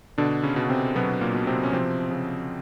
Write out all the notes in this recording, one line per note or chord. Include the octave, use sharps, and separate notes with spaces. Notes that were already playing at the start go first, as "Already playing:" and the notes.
B2 D3 D4
C#3 C#4
B2
C3 C4
B2 F#3 B3
A#2 A#3
B2
C3 C4
C#4
C3 F3 C4
C#3